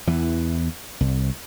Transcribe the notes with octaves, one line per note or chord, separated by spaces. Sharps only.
E2 E3
C2